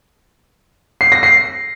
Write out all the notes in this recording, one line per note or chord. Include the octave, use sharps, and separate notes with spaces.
C7
A#6
C7